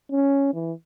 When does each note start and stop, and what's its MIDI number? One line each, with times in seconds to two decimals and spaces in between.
0.12 0.52 61
0.53 0.72 52